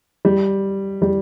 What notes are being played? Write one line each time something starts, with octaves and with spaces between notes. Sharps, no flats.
G3
G3